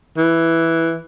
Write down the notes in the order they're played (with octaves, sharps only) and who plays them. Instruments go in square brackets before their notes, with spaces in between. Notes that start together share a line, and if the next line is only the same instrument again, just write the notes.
[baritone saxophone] E3